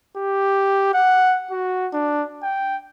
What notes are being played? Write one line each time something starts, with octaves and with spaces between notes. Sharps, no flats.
G4
F#5
F#4
D4
G5